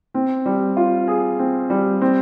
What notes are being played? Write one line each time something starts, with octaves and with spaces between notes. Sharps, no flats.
C4
G3
F4
G#4
C4
G3
C4